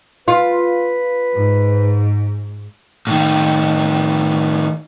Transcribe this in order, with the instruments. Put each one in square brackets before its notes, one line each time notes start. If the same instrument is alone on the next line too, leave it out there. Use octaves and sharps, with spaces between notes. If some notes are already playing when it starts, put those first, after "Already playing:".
[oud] F4 [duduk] B4
[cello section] G#2
[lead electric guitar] A2 D#3